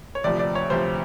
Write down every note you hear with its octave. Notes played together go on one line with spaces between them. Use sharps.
C#5
D2 C3 F3 D5
D5
C#5
D2 C3 F3 C5